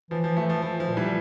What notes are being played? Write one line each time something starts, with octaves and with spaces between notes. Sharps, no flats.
E3 F3
F3
F3 A3
F3
E3 F3
F3
A#2
E3 G3